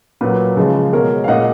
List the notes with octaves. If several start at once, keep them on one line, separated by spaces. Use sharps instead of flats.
A#2 F#3 B4
C#3 F3 G#3
B2 G#3 A#4 C#5
F5
A#2 G#3 D#5 F#5